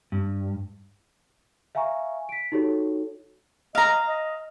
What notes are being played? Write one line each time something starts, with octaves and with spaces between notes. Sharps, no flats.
G2
E5 F5 G#5 A#5 C#6
B6 D7
D#4 F#4 G4 A4 C#5
D#5 F5 A#5
D#5